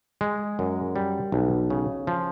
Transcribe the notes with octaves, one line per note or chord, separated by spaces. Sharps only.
G#3
F#2
G3
B1
C#3
F3